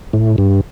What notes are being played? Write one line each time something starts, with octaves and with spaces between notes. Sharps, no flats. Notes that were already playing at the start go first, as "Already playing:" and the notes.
A2
G2